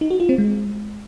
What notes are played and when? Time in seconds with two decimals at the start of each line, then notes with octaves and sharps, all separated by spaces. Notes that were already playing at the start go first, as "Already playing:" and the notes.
0.01 D#4
0.10 F#4
0.20 F4
0.29 C4
0.38 G#3